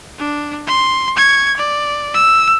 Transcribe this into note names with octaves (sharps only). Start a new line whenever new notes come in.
D4
C6
C#6 G#6
D5
E6